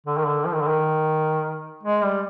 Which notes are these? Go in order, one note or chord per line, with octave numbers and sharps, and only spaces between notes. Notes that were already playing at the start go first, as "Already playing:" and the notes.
D3
D#3
D3
F3
D#3
D3
D#3
G#3
G3